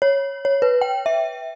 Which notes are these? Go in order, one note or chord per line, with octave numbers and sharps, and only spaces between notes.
C#5
C#5
B4
G5
E5